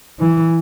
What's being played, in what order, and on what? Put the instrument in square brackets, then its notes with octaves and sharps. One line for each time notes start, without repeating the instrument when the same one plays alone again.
[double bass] E3